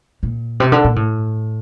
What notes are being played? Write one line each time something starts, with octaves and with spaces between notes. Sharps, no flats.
A#2
C3
D3
A#2
A2